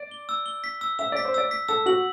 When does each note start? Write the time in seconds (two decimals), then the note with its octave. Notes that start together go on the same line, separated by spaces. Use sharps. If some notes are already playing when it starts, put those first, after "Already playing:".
Already playing: D5
0.11 G7
0.29 E6
0.46 G7
0.64 B6
0.81 E6
0.99 E5 E6
1.12 D5 B6
1.25 C5
1.34 D5 E6
1.51 B6
1.68 A4 E6
1.86 F#4 F#7